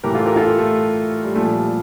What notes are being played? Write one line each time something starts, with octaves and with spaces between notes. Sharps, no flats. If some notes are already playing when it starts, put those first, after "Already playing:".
A2 E3 G4 A#4
F4 A4
G4 A#4
F4 A4
A3
G3
A#2 F3 A3
G3